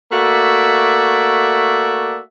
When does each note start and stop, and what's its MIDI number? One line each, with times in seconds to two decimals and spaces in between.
0.12 2.19 57
0.12 2.19 58
0.12 2.19 66
0.12 2.19 74
0.12 2.19 76